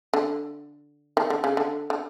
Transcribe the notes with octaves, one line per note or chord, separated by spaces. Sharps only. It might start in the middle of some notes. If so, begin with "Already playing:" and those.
D3
D#3
D3
C#3
D3
D3